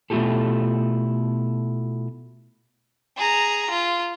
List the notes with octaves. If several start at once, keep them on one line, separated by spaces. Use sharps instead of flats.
B2 A3 E4 F4 G4 A4
G#4 A#5
F4